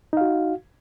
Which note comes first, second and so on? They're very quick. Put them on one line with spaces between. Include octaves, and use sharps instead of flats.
D#4 F5 F#4